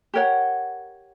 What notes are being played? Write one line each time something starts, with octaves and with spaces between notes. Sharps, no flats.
G4 A#4 C#5 F#5